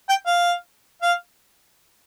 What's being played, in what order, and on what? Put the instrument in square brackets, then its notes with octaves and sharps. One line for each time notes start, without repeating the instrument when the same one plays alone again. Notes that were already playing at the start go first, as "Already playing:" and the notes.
[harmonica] G5
F5
F5